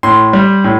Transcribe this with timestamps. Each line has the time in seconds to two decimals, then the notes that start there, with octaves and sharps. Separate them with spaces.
0.03 A2 C6
0.33 G3
0.64 A2